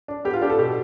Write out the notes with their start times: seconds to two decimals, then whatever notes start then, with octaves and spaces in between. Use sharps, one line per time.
0.08 D4
0.25 B3 G4
0.33 F4
0.42 D4 G4
0.50 A4
0.58 B2 G4